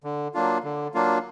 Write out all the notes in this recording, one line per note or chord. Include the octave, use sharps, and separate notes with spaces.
D3
F#3 A#3 D4 F4
D3
F#3 A#3 D4 F4